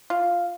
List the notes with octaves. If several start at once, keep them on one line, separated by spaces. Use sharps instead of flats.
F4